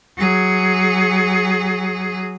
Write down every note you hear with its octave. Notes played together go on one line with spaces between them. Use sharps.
F#3 G#4